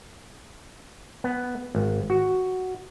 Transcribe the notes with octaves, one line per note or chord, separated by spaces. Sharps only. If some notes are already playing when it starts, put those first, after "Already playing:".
B3
G#1
F#4